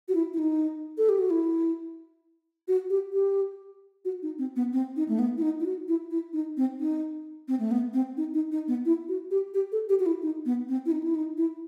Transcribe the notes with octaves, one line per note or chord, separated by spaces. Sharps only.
F#4
E4
E4
D#4
A4
G4
F#4
E4
F#4
G4
G4
F#4
D#4
C4
B3
C4
D#4
A3
B3
E4
D#4
E4
F#4
E4
E4
D#4
C4
D#4
C4
A3
B3
C4
D#4
D#4
D#4
B3
E4
F#4
G4
G4
A4
G4
F#4
E4
D#4
B3
C4
E4
D#4
E4
D#4
E4